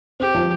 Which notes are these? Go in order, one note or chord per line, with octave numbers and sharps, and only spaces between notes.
C4 G4
F3